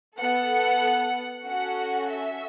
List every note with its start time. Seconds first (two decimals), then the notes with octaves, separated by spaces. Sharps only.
0.18 B3 A4 F#5
1.45 C#4 F#4 A4 F#5
2.09 E5